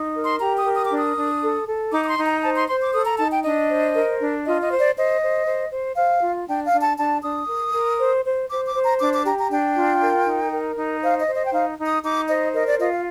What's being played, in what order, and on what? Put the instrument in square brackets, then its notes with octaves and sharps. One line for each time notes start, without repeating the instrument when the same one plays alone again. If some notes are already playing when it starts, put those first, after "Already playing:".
Already playing: [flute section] D#4
A#4
C6
G4 A#5
D#6
A#4
D#6
D6
D4
D#6
D4
A4
A4
D#4 D6
D6
C6
D#4
A#5
C5 A5
C6
C5 C6
D6
A4 D#6
A#5
D#4 A5
G5
D4 D#5
C5
A#4
D4
F4 D#5
D#5
C5
D5
C5 D#5
C5
C5
C5
C5 F5
F4
D4 G5
F5
D4
A5
D4 A5
D4 D#6
A#4
A#4
C5
C5
C5 D6
D6
C5
A#5
D4 D6
D6
G4 A#5
A#5
D4 G5
F4
A#4
D#4
A#4
D#4
C5 F5
D#5
C5
D#5
G5
D#4 F5
D#4
D#6
D#4 D6
C5 D#5
A#4 D#5
D5
F4 D#5
F5